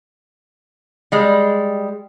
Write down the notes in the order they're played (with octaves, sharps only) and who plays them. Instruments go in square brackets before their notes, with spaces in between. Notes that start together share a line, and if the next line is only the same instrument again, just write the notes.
[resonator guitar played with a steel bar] G3 G#3